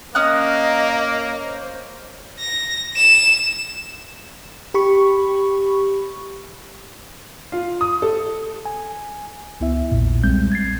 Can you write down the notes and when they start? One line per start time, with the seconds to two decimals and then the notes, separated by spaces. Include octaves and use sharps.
0.15 A#3 C#4 D#5 D#6 F#6
1.44 C5
2.40 A#6
2.97 E7
4.74 G4 B5 C#6
7.52 F4
7.81 D#6
8.02 A4
8.66 G#5
9.60 C#2 B3 E4 E5
9.91 A#1 E2 A#2
10.23 B1 G3 G#3 C4 G6
10.52 G#6 A6 C7